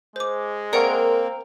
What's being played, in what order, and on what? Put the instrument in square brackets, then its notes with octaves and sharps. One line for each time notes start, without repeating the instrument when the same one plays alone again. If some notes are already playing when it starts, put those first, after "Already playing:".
[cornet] G#3 [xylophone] C5 D6
[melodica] A#3 C4 [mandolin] A#4 [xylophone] D5 F#5 C#6